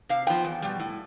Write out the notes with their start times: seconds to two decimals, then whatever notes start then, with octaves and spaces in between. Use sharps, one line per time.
0.09 C3 F5
0.27 F3 B3 G5
0.44 E2
0.62 B2 G3
0.80 A2